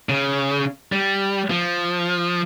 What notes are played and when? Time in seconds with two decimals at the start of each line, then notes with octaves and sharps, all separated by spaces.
0.09 C#3
0.92 G3
1.50 F3